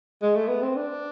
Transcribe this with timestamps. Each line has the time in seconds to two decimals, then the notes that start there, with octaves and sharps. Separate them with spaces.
0.22 G#3
0.35 A3
0.48 B3
0.62 C4
0.76 D4